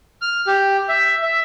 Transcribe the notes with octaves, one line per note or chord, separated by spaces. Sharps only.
F6
G4
E5
E5